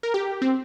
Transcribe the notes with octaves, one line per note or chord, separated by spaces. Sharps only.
A#4
G4
C4